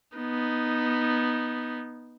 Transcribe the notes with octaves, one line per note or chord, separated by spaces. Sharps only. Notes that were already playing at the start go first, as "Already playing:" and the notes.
B3 D#4